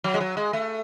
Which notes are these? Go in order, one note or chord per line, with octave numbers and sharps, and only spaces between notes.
F#3
G#3
F#3
G#3
A3